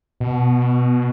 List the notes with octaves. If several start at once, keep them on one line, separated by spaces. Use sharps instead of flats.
B2